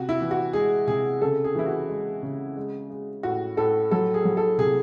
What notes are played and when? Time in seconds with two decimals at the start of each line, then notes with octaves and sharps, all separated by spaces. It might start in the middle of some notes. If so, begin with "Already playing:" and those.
Already playing: C3 F#4
0.09 E4
0.21 E3
0.31 F#4
0.53 G#3 G#4
0.87 C3 G#4
1.21 C#3 A4
1.44 G#4
1.55 E3 E4
1.66 F#4
1.89 G#3
2.23 C#3
2.57 G#3
2.90 G#3
3.23 A2 F#4
3.57 A2 A4
3.91 F#3 A4
4.14 G#4
4.25 F#3
4.37 A4
4.58 C3 G#4